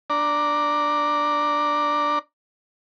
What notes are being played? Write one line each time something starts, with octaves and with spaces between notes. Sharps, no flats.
D4 D5 A#5